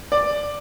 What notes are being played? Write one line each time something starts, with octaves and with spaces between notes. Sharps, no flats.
D5